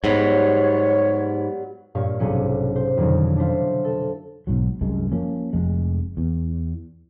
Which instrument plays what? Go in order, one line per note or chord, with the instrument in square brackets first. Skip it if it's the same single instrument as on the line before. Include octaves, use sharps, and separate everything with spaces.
[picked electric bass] G#2 [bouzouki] F#3 G3 B3 [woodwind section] C#5
[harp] G2 A#2 C#5 F5 C#6
B1 G#2 C3 F#3 C#4 C#7
C5
F2 B2 D3 D#3 F3 F#3
D4 E4 C5 F5
A4
[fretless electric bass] B1 G#2 F#3
C2 F#2 G#3
F3 A#3 C#4
F1 F2 G#3
E2